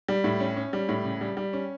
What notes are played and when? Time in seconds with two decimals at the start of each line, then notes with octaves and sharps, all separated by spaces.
0.09 G3
0.24 A2
0.40 C#4
0.57 C#4
0.73 G3
0.89 A2
1.05 C#3
1.21 G3
1.37 G3
1.53 C#4